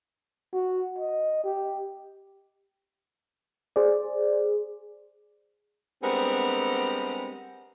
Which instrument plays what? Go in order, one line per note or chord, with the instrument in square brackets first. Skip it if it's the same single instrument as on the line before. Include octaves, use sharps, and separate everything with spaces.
[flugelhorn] F#4
D#5
G4
[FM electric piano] G#4 C5 D5
[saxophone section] G3 G#3 B3 C4 D4 A#4